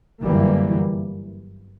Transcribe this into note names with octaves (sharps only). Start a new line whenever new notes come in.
G1 F#2 E3 G3 A#3